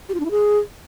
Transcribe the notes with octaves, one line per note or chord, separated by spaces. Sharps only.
G4
F4
D4
E4
G#4